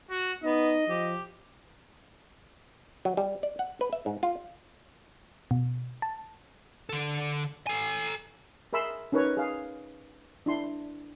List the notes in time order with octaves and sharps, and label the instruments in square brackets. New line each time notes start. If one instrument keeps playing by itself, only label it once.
[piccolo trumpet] F#4
[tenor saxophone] B3 [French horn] D#4 [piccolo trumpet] D#5
[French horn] F3 [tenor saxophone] G4
[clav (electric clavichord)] F#3
G3
D5
F#5
B4
E5
G#2
F4
[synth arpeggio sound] B2
A5
[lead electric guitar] D3 A4
A4 G#5
[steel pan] G#4 A#4 E5 B5 C6 E6
C#4 D#4 A#4 B4 C#5
G#4 F5
D4 E4 C6